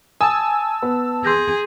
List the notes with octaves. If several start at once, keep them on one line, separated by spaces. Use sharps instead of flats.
G#5 A5 D#6 E6
B3
G#4 C6 G6 A#6